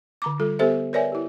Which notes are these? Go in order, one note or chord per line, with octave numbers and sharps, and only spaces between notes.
D3 A#5 D6
G3 F4 A4
B3 G4 A4 C5 E5
A#4 B4 C#5 D5 E5 G#5
E4 G4